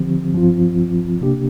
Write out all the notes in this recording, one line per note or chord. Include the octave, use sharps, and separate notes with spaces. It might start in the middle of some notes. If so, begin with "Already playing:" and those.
Already playing: D3 F3 C4 G4
G2 F3 C4 F4
C3 A#3 D4 G4